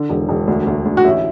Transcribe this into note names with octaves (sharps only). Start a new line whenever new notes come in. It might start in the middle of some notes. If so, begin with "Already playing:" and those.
Already playing: D3
E1
E1
D2
D2
D2
F#4
A1 E4